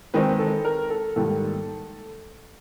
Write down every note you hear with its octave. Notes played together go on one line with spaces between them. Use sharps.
D#3 G#3 C4 D#4 B4
A4
A#4
A4
G#2 D#3 G3 A#3 A4